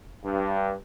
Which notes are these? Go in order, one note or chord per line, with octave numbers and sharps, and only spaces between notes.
G2